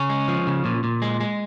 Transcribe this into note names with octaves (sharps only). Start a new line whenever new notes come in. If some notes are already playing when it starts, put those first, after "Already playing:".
Already playing: C#3 C#4
G#3
F3
C#3
A#2
A#2
G#3
G#3